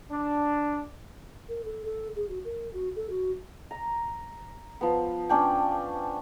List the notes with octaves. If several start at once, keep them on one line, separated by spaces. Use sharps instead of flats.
D4
A#4
A4
A4
G#4
F#4
A#4
F#4
A4
F#4
A#5
F3 B3
C#4 D4 G5